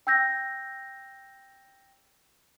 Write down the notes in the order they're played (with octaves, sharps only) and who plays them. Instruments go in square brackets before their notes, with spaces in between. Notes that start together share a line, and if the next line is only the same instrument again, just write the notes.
[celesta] G5 E6 G6 A#6